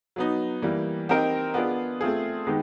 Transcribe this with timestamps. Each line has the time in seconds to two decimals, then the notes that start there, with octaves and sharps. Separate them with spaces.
0.16 F#3 B3 D#4
0.62 E3 G3 A#3
1.09 C4 D#4 G4 A#4 D#5
1.54 B3 D4 F4 G#4
2.01 A3 C4 F4 G#4
2.46 D#3 G#3 B3 D#4 G4